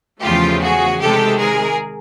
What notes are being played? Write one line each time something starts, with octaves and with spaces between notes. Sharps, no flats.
E2 C#3 F3 A3 F4 G4
F#4 G#4
C3 D#3 G#3 G4 A4
G#4 A#4